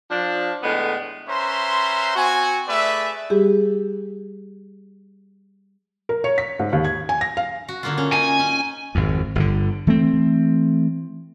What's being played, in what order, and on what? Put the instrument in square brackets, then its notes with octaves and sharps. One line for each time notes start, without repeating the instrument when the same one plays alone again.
[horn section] F3 D4
A2 D3 G#3 B3
[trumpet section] C#4 B4 C5 E5 A#5 C6
C4 F#4 G#5
A3 G#4 B4 D5 E5
[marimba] G3 G4 G#4
[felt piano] A#4
C#5
B6
G#2
D#2
G#6
G#5
A#6
F5
[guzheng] F#4
D3 A#3 F4
C#4
[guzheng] D#4 [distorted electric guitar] G#5
[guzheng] C#4
[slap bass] G#1 F2
G1 D3
E3 A3 C4